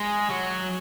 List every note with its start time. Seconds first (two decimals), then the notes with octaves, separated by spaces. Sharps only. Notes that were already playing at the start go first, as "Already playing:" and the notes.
Already playing: G#3
0.31 F#3